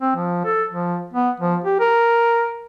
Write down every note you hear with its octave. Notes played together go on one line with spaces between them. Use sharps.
C4
F3
A4
F3
B3
F3
G4
A#4